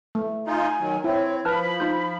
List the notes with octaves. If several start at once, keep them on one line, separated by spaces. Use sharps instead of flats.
A3
D#4 F4 G#5
D#3 F#3
C4 E4 C#5
F3 B4 A5 B5 F6
D#4 F4 G6